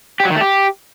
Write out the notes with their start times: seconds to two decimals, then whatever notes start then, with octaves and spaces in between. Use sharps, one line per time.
0.20 G4
0.25 F#3
0.30 D#3
0.36 A3
0.41 G4